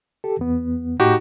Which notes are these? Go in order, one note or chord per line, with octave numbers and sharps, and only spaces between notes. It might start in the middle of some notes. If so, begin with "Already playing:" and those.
G4 A4
E2 B3
A2 D#4 F#4 G4